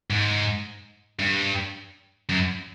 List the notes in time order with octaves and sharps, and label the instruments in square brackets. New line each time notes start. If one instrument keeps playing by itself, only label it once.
[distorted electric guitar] G#2
G2
F#2